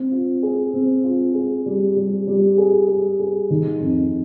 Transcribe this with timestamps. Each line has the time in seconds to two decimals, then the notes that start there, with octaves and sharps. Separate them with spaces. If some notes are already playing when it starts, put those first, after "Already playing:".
Already playing: C4
0.12 F4
0.43 G#4
0.74 C4
1.04 F4
1.34 G#4
1.66 G3
1.96 G3
2.27 G3
2.58 G#4
2.88 G#4
3.19 G#4
3.50 D#3
3.80 F2